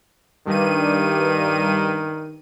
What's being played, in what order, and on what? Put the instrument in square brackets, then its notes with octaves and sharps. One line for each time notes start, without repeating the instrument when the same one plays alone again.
[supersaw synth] G2 D#7 [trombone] D#3